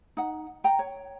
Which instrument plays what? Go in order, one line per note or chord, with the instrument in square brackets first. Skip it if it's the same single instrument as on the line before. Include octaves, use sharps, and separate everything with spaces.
[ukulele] D#4 F#5
G5 A#5
C#5